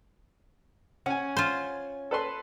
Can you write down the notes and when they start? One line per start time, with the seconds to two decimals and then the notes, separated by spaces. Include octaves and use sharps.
1.06 C#4 F#5 G#5
1.37 F4 C5
2.11 A4 B4 C6